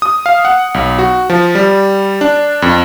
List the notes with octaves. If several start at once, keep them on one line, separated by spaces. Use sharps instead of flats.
D#6
F5
F#5
B1
F#4
F3
G3
D4
F2